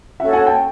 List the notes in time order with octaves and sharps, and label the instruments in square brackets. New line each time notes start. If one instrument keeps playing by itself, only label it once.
[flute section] C#4 F#4 A4 C#5 [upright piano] E5 F#5
[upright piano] F#5 G#5
G5 A5